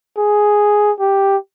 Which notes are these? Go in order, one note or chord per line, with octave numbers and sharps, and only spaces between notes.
G#4
G4